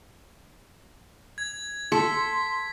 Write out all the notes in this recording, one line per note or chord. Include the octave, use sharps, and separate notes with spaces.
G#6
A4 C6 B6